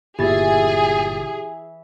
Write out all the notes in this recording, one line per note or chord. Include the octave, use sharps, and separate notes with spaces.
G1 A#2 E3 G4 G#4 E5 A6